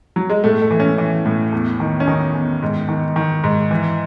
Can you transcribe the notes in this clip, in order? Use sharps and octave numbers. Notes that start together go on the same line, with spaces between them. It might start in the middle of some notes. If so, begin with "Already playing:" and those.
F#3
G#3
A2 A3
A3
E3
C#4
E3
A2
E2
D#3
C#4
D#3 D#4
E2
G#2
D#3
D#3
G#2
E3